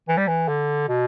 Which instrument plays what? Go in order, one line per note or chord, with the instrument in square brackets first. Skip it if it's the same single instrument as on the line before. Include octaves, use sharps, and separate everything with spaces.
[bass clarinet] E3
G3
E3
D3
B2